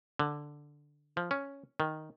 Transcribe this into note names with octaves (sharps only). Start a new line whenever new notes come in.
D3
F3
C#4
D#3